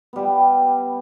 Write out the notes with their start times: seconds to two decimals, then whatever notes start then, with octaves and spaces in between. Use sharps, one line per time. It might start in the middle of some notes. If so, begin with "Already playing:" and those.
0.13 B3
0.16 G3
0.18 G4